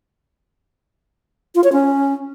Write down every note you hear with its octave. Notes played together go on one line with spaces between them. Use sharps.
F4
C#5
C#4